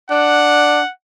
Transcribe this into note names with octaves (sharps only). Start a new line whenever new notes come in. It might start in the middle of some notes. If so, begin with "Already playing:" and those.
D4 F#5